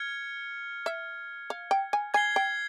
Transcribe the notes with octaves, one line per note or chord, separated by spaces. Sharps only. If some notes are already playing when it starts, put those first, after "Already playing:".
Already playing: F6 G#6 C#7
E5
F5
G5
G#5
G#5 G#6 C7 G7
G5